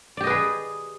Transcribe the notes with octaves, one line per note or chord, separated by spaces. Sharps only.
G4 G#4 B4 D5 D#5